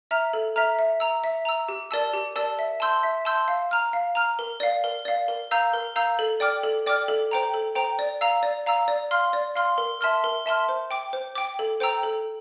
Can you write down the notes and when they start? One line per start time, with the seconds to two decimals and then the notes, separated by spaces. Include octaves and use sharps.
0.11 E5 A#5 F6
0.33 A4
0.56 E5 A#5 F6
0.79 E5
1.00 A#5 E6
1.24 E5
1.45 A#5 E6
1.69 G4
1.91 A#4 D5 A5 E6
2.13 G4
2.36 A#4 D5 A5 E6
2.59 E5
2.80 A5 C6 E6 G6
3.03 E5
3.25 A5 C6 E6 G6
3.48 F5
3.71 A#5 F6
3.93 F5
4.15 A#5 F6
4.39 A#4
4.60 D5 F5
4.84 A#4
5.05 D5 F5
5.28 A#4
5.51 F5 A#5 E6 G6
5.73 A#4
5.96 F5 A#5 E6 G6
6.19 A4
6.40 D5 G5 D6 F6
6.64 A4
6.86 D5 G5 D6 F6
7.08 A4
7.31 C5 G5 A#5
7.54 A4
7.75 C5 G5 A#5
7.99 D5
8.21 F5 A#5 E6
8.43 D5
8.66 F5 A#5 E6
8.88 D5
9.11 F5 C6 F6
9.33 D5
9.56 F5 C6 F6
9.78 A#4
10.01 E5 A5 C6 F6
10.24 A#4
10.46 E5 A5 C6 F6
10.69 C5
10.91 G5 D6
11.13 C5
11.35 G5 D6
11.59 A4
11.80 C5 G5 A#5 E6
12.03 A4